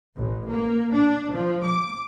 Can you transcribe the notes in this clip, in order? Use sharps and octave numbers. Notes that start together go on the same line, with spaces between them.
A1
A#3
D4
F3
D6